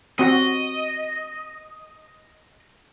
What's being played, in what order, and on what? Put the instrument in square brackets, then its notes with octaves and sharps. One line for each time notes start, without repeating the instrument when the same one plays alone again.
[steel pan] C4 F#4 [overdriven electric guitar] D#5